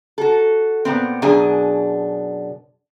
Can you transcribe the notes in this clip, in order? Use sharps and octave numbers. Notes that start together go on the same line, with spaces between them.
F#4 A4
A#2 B3 C4
F#2 B2 D4 G#4 G#5